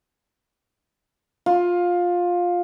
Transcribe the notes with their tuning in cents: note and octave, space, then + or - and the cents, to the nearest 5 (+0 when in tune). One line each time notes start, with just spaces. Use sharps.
F4 +15